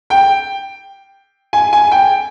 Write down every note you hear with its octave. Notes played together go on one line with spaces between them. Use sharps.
G5
G#5
G#5
G5